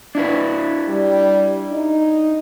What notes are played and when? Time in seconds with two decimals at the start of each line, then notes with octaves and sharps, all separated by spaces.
0.15 D4 E4 B4
0.88 G3
1.72 D#4